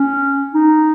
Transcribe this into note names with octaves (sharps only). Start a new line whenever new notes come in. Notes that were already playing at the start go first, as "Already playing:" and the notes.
Already playing: C#4
D#4